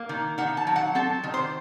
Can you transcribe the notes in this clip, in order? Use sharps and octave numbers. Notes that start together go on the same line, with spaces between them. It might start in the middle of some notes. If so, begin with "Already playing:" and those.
Already playing: A#3
D#3
D#3 F#5
A5
F#3
F#5
C4 A4
D#3
C5